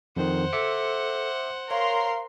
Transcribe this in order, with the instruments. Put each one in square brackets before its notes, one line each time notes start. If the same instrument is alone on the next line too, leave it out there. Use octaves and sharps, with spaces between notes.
[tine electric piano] F2 D#3 [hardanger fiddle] C5 F#5
[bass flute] A4 [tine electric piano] E5 D6 C#7
[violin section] A#4 C6 [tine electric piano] C#5 [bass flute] F5